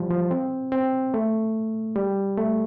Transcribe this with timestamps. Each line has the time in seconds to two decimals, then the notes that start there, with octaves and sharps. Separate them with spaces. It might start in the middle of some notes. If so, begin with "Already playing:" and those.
Already playing: E3 F3 G3
0.11 F3
0.31 C4
0.72 C4
1.14 A3
1.96 G3
2.37 A3